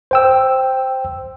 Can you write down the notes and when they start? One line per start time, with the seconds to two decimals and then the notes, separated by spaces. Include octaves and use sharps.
0.11 C5 G5 E6